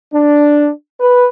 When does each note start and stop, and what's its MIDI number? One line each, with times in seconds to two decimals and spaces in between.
0.13 0.69 62
1.00 1.26 71